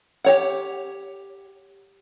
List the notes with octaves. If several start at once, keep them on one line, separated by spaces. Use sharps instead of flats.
G4 C#5 F#5